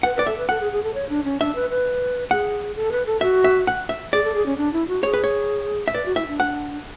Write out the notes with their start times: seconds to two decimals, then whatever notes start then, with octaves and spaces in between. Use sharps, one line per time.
0.03 B4 F#5
0.16 B4 D5
0.27 A4 E5
0.38 B4
0.49 A4 F#5
0.61 G#4
0.72 G#4
0.83 A4
0.94 C#5
1.09 D4
1.25 C#4
1.40 D4 E5
1.55 B4
1.70 B4
2.31 G#4 F#5
2.76 A4
2.92 B4
3.06 A4
3.21 F#4 E5
3.44 E5
3.67 F#5
3.89 E5
4.12 G#4 D5
4.24 A4
4.35 G#4
4.46 C#4
4.58 D4
4.73 E4
4.88 F#4
5.03 G#4 C#5
5.14 B4
5.24 C#5
5.88 E5
5.93 B4 D5
6.06 F#4
6.16 E4 E5
6.27 D4
6.40 F#5